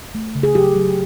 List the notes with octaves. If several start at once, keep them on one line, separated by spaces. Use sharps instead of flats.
A3
C#3
G#4
F#3 G4
F#3